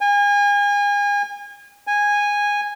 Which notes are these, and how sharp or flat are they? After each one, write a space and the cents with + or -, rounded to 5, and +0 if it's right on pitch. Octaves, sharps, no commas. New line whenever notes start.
G#5 -35
G#5 -15